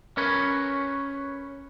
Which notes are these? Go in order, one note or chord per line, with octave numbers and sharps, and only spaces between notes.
C#4 A#4 B4 C#5